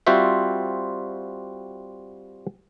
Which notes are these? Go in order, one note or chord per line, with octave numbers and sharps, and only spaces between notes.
G3 C4 F4 F#4 C5 E5